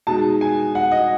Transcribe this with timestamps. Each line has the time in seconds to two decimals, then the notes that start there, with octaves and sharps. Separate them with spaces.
0.07 B2 G#3 D#4 A5
0.41 G#5
0.75 F#5
0.92 D#5